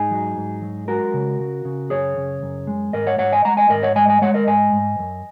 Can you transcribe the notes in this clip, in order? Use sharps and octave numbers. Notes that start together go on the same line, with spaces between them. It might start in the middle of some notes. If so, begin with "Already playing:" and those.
Already playing: G#2 D#4 G#4
F#3
G#2
F#3
G#3 F#4 A#4
C#3
C#3
C#3
F#2 G#4 C#5
C#3
F#2
G#3
G#2 A#4 D#5
C#5 F#5
G#2 C#5 F#5
D#5 G#5
G#3 F#5 A#5
D#5 G#5
G#2 A#4 D#5
C#5 F#5
G#3 D#5 G#5
D#5 G#5
G#3 C#5 F#5
A#4 D#5
G#2 D#5 G#5
G#2
F#2